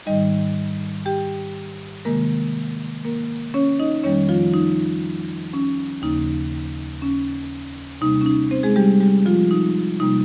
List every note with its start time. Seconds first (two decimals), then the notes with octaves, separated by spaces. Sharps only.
0.06 G#2 D#3 G3 D#4 D#5
1.05 G4 G5
2.05 C3 D#3 G#3 A#3 A#4
3.04 A#3 A#4
3.54 C#4 C#5
3.79 D#4 D#5
4.03 F2 D#3 G3 A#3 C#4 C#5
4.29 F3 F4
4.54 D#4
5.53 C#4
6.02 D#2 C#3 F3 A#3 D#4
7.02 C#4
8.01 C3 G3 A#3 D#4
8.21 C#4
8.26 D#4
8.51 C4 C5
8.63 G#3 G#4
8.76 G3 G4
9.00 G3 G4
9.26 F3 F4
9.51 D#4
10.00 C3 G3 A#3 D#4